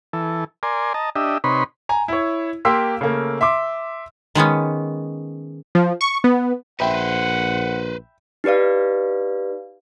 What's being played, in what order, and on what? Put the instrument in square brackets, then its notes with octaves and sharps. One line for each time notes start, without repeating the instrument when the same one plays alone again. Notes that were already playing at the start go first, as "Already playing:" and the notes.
[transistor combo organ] E3 A4
A#4 D5 G#5 C6
D#5 A5 A#5
D4 G4 D#5 E5
C3 D#4 B4 C#5 B5 C6
[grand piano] G#5 A#5
E4 C#5
A#3 G4 C6 E6 B6
C#3 A3 A#3
E5 C6 D6
[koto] D#3 G#3 B3 C#4
[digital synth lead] F3
C#6
B3
[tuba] A#1 [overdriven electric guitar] B4 C5 [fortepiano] E5 G5 B5 [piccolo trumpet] F#5
[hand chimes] D#4 G4 B4 D5 F5